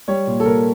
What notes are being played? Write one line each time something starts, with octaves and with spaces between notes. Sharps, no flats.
G3 C#5
A#2
A4
A#2 A#4